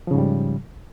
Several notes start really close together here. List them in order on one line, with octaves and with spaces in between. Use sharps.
F3 C#3 G#2 G3